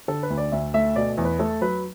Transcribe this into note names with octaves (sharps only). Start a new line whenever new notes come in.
D3 A4
B4
D2
D5
D2 E5
A3 E5
B2 D5
E2
B4
A3 A4
F#3 B4